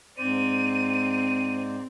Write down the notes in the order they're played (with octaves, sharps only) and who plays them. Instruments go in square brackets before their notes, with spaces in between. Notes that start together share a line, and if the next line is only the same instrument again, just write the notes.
[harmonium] G#2 C5 D5 [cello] C4 [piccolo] D#7